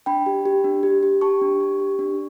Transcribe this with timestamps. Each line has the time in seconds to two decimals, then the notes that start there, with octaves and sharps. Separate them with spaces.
0.06 D4 G5 B5
0.26 G4
0.46 G4
0.64 D4
0.83 G4
1.03 G4
1.21 G4 A5 C#6
1.41 D4
1.60 G4
1.80 G4
1.99 D4